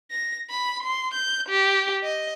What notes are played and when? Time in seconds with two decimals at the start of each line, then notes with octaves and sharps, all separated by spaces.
0.11 A#6
0.50 B5
0.83 C6
1.14 G6
1.49 G4
2.03 D#5